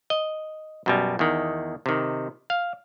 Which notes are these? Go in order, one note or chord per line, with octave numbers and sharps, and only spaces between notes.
D#5
F#2 B2 G3
E2 D#3
C3 D#3
F5